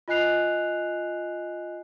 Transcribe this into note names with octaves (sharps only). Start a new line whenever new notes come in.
F4 D#5 G#5 F#6 C7 F7